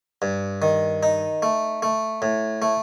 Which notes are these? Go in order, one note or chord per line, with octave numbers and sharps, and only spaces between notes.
G2
D#3
D#4
A3
A3
A2
A3